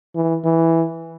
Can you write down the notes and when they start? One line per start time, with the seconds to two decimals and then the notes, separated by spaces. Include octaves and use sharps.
0.16 E3
0.44 E3